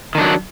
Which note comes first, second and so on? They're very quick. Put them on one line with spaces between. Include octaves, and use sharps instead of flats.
D#3 D4 F#3